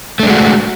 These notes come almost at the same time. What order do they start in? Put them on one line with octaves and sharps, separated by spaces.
A3 D4 G#3 F#4